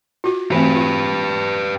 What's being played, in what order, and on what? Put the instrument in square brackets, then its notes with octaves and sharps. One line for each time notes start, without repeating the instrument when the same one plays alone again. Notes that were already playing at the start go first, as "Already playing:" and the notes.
[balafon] F4 F#4
[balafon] E3 A3 C4 [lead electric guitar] G4 B4
[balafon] F4